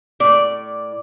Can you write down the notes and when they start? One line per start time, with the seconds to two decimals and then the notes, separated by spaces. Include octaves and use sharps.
0.20 A2 D5